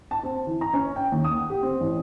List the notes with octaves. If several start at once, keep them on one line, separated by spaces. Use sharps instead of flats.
A5
C4
E3
A#5
C#4
G5
D#2
D#6
F#5
G4
C4
A1